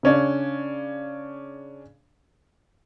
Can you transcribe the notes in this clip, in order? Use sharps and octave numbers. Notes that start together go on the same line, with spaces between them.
C#3 C#4 D4